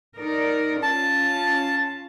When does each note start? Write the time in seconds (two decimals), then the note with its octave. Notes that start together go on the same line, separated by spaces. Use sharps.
0.17 D#4 A#4 D5
0.83 C#4 F4 A5